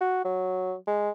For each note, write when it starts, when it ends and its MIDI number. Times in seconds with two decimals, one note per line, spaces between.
0.01 0.22 66
0.25 0.74 54
0.87 1.10 56